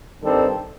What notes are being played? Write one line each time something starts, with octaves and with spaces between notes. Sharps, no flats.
G2 D#3 G3 C4 A4